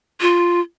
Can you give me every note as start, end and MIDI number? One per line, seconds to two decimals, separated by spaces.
0.21 0.60 65